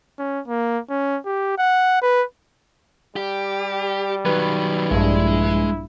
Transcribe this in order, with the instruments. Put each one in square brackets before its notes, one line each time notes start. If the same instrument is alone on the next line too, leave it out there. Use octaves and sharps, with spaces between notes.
[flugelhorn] C#4
A#3
C#4
G4
F#5
B4
[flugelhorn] G3 [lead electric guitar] G4
[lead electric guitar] D#3 F#3 [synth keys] B4
[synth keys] A#1 G2 [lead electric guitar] G#3 [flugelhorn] E4